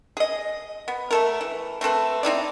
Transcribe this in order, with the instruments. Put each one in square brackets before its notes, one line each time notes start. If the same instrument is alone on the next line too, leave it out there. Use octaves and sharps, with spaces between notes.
[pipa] G#4 D#5
B3
A3 A4 A#4
E3
A3 C4 A4 B4
C4 D#4 E4 D5